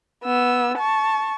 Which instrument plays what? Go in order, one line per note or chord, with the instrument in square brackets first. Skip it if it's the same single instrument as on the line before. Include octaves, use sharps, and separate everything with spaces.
[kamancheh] B3 E6
A5 C#6